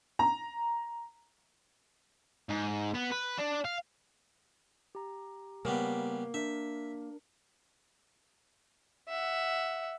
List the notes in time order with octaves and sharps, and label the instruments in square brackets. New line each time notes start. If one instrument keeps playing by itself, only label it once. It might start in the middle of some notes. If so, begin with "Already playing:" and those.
[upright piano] A#5
[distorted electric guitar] G#2
B3
B4
D4
F5
[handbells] G4 A#5
[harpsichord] C#3 G3 B3 [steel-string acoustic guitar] A#3
[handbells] D4 A#4 [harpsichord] E5
[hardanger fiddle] E5 F#5